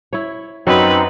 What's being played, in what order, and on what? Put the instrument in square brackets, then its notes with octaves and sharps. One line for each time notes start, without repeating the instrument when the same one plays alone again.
[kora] E4 C#5
[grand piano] F#2 [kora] F#3 [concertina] C4 D#4 [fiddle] B4